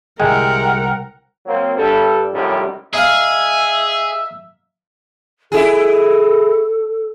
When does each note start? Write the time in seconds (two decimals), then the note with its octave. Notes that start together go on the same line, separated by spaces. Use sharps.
0.20 C2 C3 G#3 A#4 F#5 G5
1.46 F#3 A#3 C4
1.77 G2 G3 A4
2.33 F#2 A2 C3 F3 G3 D#4
2.93 D#4 G#4 E5 F5
5.52 E4 G#4 A4